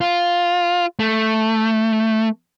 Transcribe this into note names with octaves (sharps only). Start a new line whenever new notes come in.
F4
A3